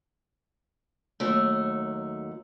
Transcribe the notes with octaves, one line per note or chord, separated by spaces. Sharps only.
D#2 F#3 A3